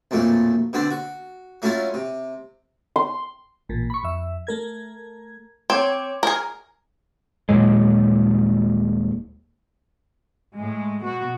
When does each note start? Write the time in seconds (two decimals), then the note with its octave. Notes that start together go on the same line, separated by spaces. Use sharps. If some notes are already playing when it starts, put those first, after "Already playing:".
0.11 B1 F2 A#2 A3
0.73 B2 D3 C4 D4
0.91 F#4
1.62 F#3 A3 C#4 E4 F4
1.94 C3
2.96 C6
3.69 A1 A#2
3.90 B5 C#6
4.03 F2 E5
4.47 A3 A#4 G#6
5.70 C4 C#5 D6 G#6
6.23 G#4 A#4
7.49 D#1 A#2 F#3 G#3
10.55 A2 G#3
11.03 B2 F#4